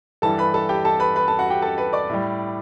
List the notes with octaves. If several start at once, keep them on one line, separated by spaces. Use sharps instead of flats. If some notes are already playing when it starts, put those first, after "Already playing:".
G2 E3 G3 A4 A5
B4 B5
A4 A5
G4 G5
A4 A5
B4 B5
B4 B5
A4 A5
F#4 F#5
G4 G5
A4 A5
B4 B5
D5 D6
A2 G3